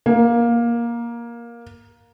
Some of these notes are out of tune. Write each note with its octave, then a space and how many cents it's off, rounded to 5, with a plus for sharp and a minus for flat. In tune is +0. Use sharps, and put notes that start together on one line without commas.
A#3 +15